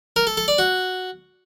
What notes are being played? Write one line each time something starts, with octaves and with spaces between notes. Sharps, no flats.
A#4
A4
A4
D5
F#4